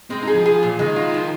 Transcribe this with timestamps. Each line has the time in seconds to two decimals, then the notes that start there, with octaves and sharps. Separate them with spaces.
0.10 G#3 C4
0.22 D#4
0.27 G#4
0.34 F3
0.46 G#4
0.63 A#2
0.79 D#3 G#3
0.96 F4
1.14 F3